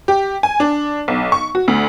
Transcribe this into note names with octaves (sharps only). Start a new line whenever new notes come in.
G4
G#5
D4
B1
C#6
F#4
D2